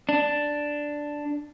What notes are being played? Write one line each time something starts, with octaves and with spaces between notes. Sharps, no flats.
D4